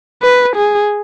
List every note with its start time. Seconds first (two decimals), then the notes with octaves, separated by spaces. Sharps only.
0.23 B4
0.56 G#4